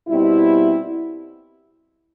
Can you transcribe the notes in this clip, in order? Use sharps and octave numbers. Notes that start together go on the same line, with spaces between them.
B2 G3 C4 E4